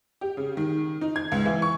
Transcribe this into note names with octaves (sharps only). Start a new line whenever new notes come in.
G4
C#3
D#3
D#4
G#6
C#2
E3
C#6